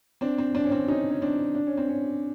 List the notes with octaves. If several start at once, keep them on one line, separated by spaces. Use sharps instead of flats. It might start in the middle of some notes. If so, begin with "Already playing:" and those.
C4 D4
C4
C4 D4
C#4
C4 D4
C#4 D#4
C#4
C4 D4
D4
C#4
C4
C#4